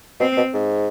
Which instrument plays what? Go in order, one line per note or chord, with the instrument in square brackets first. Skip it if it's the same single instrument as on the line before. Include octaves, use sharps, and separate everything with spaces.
[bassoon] B2 [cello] C4
[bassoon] B2
G#2